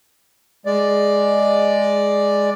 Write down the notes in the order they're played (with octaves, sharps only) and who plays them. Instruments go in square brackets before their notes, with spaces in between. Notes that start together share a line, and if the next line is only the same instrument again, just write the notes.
[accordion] G#3 D5